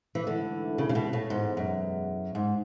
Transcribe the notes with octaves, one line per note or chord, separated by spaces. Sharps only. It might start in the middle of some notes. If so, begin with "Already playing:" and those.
E3
G#2 D3 E3 A3 E4
C#3
C#3
B2
A2
E2 G#2 B2 G#3 B3
F#2
G#2